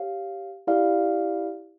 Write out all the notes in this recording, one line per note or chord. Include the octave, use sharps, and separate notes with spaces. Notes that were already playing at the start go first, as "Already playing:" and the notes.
Already playing: G4 C#5 F5
E4 G4 D5 F5